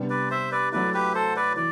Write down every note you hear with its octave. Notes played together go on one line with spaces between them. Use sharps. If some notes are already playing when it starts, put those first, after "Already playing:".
Already playing: C3 G3 B3 D4
B4 D5
C5 E5
B4 D5
F#3 A3 E4 B4 D5
G4 B4
A4 C5
B4 D5
E3 D5